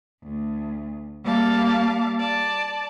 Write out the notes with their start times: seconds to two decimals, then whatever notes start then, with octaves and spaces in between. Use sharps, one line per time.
0.23 D2
1.24 G3 A#3 F5 A5 D6
2.19 D5 A5